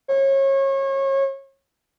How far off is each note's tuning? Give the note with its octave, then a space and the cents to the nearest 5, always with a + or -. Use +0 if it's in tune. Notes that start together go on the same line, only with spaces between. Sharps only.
C#5 -30